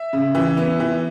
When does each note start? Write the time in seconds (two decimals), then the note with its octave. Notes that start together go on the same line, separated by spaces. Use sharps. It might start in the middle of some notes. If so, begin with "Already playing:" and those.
Already playing: E5
0.13 C#3
0.35 E3
0.57 B3
0.80 E3